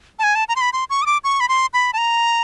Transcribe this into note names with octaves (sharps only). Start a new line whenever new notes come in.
A5
G#5
A5
A#5
C6
B5
C6
C#6
D#6
D6
C#6
B5
C6
B5
A5
A#5